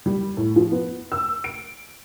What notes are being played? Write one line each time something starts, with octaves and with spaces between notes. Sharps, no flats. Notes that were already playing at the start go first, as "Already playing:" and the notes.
G3
A2
F3
B3
E6
D7